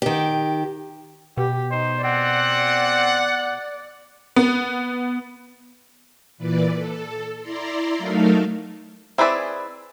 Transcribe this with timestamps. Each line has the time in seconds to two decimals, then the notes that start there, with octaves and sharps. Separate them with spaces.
0.02 D#3 G4
1.37 B2 G4
1.71 D#4 C5
2.03 C4 D5 F#5
4.36 B3
6.38 A#2 E3 B4 D5
6.75 A4
7.41 E4 D5 A#5 C6
7.97 F#3 A3 D#4 A4 A#4 F5
9.18 C4 E4 G#4 B4 D5